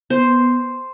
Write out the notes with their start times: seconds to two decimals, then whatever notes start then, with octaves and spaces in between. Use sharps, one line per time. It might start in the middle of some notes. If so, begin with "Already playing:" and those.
0.10 B3 C5